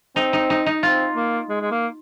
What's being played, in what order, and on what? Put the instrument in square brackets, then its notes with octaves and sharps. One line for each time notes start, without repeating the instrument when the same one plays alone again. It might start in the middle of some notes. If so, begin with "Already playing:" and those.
[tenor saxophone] C4 [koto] D#4
[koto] D#4
D#4
D#4
[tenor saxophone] C4 [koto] F4
[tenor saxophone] A#3
G#3
G#3
A#3